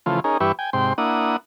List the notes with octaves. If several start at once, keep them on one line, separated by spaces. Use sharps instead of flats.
C#3 E3 F3 A3 F4
C#4 D#4 G#4 A#4
G2 E3 G4 B4 E5 C#6
G5 G#5
G#2 C3 G5 C6
A#3 D4 E4 F#5 D#6